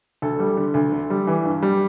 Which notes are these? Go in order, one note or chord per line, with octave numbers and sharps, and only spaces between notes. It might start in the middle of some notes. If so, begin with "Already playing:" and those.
D2 A4
G3
D3
D2
D3
G3
E3
G2
G3